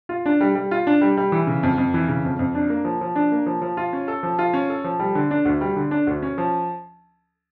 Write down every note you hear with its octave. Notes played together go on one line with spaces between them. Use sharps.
F4
D4
G3
G3
F4
D4
G3
G3
E3
C#3
F2
F2
E3
C#3
F2
F2
D4
A#3
F3
F3
D4
A#3
F3
F3
F4
C#4
A4
F3
F4
C#4
A4
F3
G3
D3
D4
D2
G3
D3
D4
D2
C#4
F3